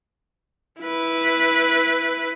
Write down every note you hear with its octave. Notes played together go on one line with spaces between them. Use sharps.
E4 B4